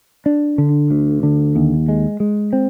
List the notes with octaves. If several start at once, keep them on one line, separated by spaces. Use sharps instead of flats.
D4
D3
D2
D3
D#2
G#3
G#3
C4